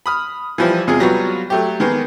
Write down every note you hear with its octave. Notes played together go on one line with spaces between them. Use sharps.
B5 D#6 F6
E3 F3 G3
E2 C3 G#3 F4 G#4
F#3 G3 B3 F4 F#4
F#3 A3 G4
D#3 G#3 A#3 B3